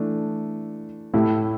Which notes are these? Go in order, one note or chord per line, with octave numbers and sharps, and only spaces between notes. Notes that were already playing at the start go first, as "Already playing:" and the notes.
Already playing: E3 A3 D4
A2 A3 E4 G4